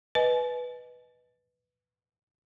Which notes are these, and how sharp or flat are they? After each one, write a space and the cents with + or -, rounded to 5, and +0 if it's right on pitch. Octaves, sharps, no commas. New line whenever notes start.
B4 +0 D#5 +0 G#5 +40